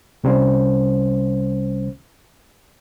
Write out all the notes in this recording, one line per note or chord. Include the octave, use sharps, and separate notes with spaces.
C2 C3 G3 C#4 C5